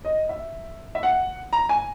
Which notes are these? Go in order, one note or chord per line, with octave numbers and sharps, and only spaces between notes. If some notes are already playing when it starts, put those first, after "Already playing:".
D#5
E5
E5
F#5
A#5
G#5